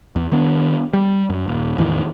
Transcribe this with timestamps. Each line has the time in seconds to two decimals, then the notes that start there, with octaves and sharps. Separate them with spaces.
0.16 E2
0.32 D#3 B3 D4
0.93 G3
1.30 F#2
1.48 D#1
1.78 E2 A2 D#3 E3